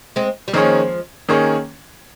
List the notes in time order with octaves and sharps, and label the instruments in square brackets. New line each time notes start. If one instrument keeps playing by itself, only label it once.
[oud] G#3 C4
G3
[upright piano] D#3 A#3 C#4 G#4 C#5 [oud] F3 G#3
[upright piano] D#3 A#3 C#4 G#4 C#5